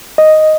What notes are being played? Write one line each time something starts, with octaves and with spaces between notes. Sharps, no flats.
D#5